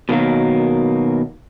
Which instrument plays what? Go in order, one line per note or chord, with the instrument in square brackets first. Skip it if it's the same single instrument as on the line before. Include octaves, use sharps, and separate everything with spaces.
[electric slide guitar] B2 D#3 F#3 A#3